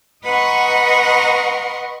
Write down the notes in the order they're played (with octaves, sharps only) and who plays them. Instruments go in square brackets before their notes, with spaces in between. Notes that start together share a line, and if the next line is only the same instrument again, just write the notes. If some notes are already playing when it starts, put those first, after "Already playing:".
[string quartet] B4 D#5 F#5 A#5 C6 C#6